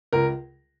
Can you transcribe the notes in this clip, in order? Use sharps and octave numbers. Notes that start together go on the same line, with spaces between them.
C#2 A#4